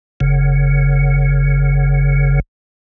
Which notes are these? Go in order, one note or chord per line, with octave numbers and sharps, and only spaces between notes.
F#1 C#3